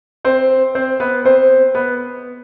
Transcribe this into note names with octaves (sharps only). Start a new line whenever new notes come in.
C4 C5
C4 C5
B3 B4
C4 C5
B3 B4